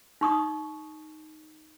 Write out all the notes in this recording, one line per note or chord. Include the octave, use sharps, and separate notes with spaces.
D#4 C#6 D#6